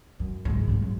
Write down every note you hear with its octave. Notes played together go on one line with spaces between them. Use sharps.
F#2
C#2 G#2
A#1 G2
A#1 F#3